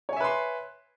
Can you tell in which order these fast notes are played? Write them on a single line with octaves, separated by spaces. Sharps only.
C#5 G#5 E5 B4 C6